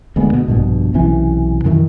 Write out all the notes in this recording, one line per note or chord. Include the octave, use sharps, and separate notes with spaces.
D2 D3 G#3 B3
B2
A#1 G2 B2
B1 C3 E3 C#4
F#2 D#3 E3